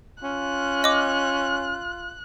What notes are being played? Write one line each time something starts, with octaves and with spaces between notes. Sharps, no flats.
C#4 F4 F#6
D#5 D6